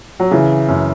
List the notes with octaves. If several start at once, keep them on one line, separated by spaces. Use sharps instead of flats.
F#3
C#3 E3
F#2